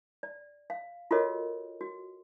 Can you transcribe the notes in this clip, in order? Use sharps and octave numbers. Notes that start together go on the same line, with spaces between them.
D5
F5
F4 F#4 A4 A#4 C#5 D#5
F#4